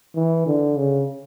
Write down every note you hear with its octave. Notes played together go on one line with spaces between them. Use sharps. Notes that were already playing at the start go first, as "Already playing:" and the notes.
E3
D3
C#3